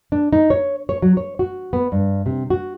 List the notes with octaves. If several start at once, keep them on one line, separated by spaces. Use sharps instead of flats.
D4
D#4
C#5
C#5
F#3
C#5
F#4
B3
G2
C3
F#4